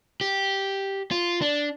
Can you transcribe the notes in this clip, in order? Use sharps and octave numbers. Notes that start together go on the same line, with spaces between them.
G4
F4
D4